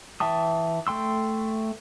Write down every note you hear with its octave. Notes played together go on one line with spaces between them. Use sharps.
E3 E5 G5 A5 D#6
A3 G5 C6 E6